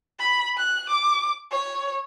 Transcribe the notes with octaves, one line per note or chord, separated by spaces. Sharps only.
B5
F#6
D6
C#5